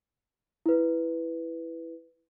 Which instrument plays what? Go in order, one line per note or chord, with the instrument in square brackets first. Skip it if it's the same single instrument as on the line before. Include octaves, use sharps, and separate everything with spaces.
[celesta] E4 B4